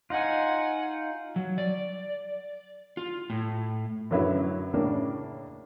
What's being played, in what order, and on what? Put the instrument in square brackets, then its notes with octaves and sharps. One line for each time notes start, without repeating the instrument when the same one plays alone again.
[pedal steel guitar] D#4 F4 [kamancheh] F#5 G#5
[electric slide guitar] F#3
D5
F4
A2
[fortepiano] F#2 D3 F#3 E4 B4
A2 C#3 A#3 D4